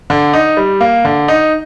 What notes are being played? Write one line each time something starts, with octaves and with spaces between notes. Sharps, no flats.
D3
D#4
G3
A#3
D3
D#4